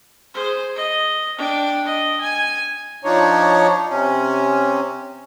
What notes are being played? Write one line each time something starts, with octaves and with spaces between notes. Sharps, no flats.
G#4 C5
D#5
D4 G5
D#5
G#5
F3 D4 D#4 C#5
C3 C#4